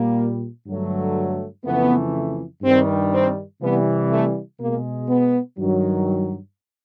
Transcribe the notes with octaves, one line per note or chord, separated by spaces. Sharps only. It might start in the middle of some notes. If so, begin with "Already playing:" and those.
Already playing: A#2 G3 A#3
G2 D3 F#3 A3
F2 C#3 E3 A3 B3
G2 D#3 G3 C4
C4
C3 E3 G3 B3
A3
B2 G#3 A#3
B3
G2 D#3 F#3